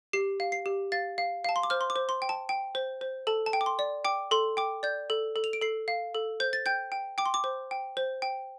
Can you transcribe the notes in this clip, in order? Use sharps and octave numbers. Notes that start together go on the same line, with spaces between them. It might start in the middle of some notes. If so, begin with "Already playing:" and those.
G4 C7
F5
C7
G4
F5 A6
F5
F5 A5
C6
D6
C5 F6
C6
D6
C5
C6
G5
A5
G5
C5
C5
A4 A5
A5
G5
D6
C6
D5
G5 D6
A4 C6
G5 D6
D5 G6
A4
A4
F7
D7
A4 C7
F5
A4
C5 G6
A6
G5 G6
G5
G5 D6
C6
D6
C5
G5
C5
G5